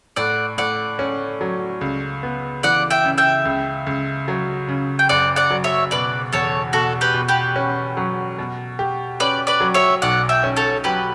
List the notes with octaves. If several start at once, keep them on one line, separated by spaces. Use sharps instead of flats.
A2 D5 F#5
A2 D5 F#5
C#4
F#3
C#2
B3
E3 D5 F#5
E5 G5
C#3
E5 G5
C#2
C#2
F#3
C#3
G5
F#1 D5 F#5
D5 F#5
F#3
C#5 E5
B2 B4 D5
E2 A4 C#5
B2 F#4 A4
G4 B4
B2
G4 B4
C#4
F#3
B2
G4
C#4 B4 D5
B4 D5
F#3
C#5 E5
B1 D5 F#5
E5 G5
C#4
A4 C#5
F#3 G4 B4